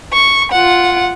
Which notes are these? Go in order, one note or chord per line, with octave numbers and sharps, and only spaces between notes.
C#6
F4 F#5